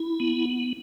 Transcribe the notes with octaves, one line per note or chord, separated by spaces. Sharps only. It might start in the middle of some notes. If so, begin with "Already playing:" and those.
Already playing: E4
B3